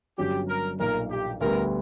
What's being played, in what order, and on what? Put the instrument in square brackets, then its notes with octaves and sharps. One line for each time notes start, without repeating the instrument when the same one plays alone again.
[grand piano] G1 G2 F#3 C#4 F#4 [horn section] G4
[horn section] A#4
[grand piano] B1 A#2 A#3 [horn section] A#4
[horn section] G4
[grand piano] D2 D3 G3 B3 [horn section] A#4